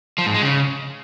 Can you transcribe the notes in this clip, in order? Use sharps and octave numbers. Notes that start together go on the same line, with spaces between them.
F3
G#2
G#3
C#3